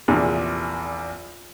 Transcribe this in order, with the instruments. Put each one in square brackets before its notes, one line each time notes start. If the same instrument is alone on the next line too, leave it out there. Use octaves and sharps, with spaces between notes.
[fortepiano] A#1 E2 C3 G#4